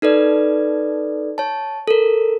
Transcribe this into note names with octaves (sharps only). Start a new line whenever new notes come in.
D#4 A4 B4 D5
C#5 A5
A4 A#4